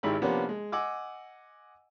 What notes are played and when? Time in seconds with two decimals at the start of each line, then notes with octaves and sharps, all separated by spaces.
0.03 G#1 D#3 G#3 E4 G4 B5
0.22 C3 F3 A#3 B3 C#4 D4
0.49 G#3
0.72 D#5 F#5 G#5 D6 E6